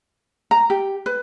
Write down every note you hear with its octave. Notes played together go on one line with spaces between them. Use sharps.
A#5
G4
B4